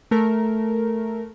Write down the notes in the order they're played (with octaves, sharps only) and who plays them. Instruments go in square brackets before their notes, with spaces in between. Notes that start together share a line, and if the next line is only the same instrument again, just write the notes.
[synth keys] A3 A#4